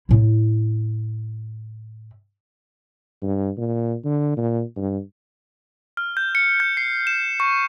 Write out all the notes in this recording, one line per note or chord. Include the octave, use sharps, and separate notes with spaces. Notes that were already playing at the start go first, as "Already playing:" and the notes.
A2 E4
G2
A#2
D3
A#2
G2
F6
G6
C#7
G6
C7
E7
C#6